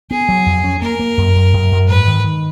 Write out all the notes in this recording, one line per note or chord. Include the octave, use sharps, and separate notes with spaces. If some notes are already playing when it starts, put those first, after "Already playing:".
B3 G#4
F#3
F2
C#4
A#3 A#4
A#3
F#2
F#2
F#2
F#2
G#2 B4
D#3
D#3